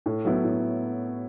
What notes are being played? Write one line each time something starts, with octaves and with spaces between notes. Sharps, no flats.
A2
F#3 B3 E4
A2